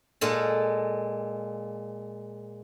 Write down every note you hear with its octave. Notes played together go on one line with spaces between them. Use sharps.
A#2 G#3 A4